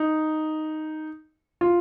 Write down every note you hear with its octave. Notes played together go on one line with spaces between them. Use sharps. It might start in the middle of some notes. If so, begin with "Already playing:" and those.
Already playing: D#4
F4